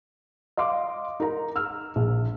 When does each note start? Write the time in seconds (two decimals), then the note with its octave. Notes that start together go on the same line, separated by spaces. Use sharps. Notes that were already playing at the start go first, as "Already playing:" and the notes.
0.57 D#5 F5 C6 D6
1.20 D#4 A#4 A#5
1.56 E6 F6
1.96 A#1